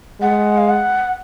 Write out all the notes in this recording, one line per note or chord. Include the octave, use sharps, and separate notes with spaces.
G#3 F#5
F5
F#5